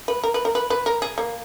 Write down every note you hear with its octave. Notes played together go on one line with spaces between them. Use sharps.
B4
A#4
B4
A#4
B4
B4
A#4
G#4
A#3